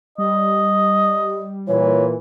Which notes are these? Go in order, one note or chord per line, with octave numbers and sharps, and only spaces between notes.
G3 D#5
A#2 E3 C#5